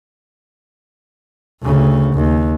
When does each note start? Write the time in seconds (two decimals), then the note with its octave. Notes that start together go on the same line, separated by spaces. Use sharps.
1.63 D2 C#3
2.15 D#2